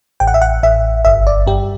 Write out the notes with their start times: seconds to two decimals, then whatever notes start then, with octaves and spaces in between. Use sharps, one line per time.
0.20 A1 G5
0.27 F#5
0.34 E5
0.42 F#5
0.63 A1 E5
1.05 G1 E5
1.27 D5
1.47 G2 G4